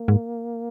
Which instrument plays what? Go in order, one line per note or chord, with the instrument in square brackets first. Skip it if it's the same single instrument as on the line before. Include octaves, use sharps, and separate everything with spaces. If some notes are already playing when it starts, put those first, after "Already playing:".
Already playing: [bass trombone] A#3
[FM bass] G#2